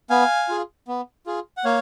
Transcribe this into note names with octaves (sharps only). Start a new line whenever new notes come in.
B3 F5 G#5
F4 G#4
B3
F4 G#4
F#5
A#3 C#5 F5